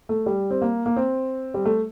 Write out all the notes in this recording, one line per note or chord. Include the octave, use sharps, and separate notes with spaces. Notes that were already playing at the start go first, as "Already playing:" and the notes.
A3
G3
C4
A#3
A#3
C4
G3
A3